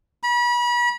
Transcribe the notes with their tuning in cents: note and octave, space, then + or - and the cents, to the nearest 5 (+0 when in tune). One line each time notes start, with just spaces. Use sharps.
B5 -35